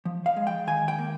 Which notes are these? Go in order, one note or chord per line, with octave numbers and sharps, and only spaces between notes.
F3
F5
G#3
G5
D#3 G#5
G5
A#3